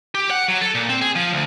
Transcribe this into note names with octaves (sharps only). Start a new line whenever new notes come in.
G4
F#5
F#3
A4
A#2
C4
G#4
F3
D2